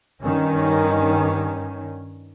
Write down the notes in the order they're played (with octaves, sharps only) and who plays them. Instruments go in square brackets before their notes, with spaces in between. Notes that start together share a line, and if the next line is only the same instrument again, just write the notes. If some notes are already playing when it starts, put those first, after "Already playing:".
[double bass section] G2 D#3 C#4